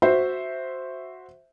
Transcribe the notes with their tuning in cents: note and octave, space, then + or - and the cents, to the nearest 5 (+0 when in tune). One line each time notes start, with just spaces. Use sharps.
F#4 -5 C5 +0 E5 +0